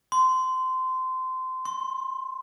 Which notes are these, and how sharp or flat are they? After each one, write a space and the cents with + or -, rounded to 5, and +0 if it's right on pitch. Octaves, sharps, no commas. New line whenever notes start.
C6 -20
C6 +30